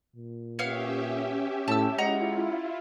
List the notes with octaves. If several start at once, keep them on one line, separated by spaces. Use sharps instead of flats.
A#2
B3 C#4 G4 C#5 E5 F5
A2 A5 E6
G#3 E4 F4 D#5 F#5 A#5